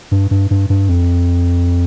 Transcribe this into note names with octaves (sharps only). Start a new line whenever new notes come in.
G2
G2
G2
G2
F2